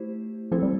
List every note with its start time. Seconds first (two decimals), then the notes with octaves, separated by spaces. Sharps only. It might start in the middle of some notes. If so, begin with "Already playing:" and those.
Already playing: A3 E4 G4 C5
0.52 F3 C4 E4 A4
0.62 G3